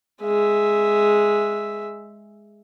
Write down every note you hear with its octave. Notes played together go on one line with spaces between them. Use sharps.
G#3 E5